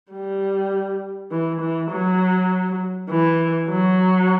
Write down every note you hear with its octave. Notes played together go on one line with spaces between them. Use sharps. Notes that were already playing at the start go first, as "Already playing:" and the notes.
G3
E3
E3
F#3
E3
F#3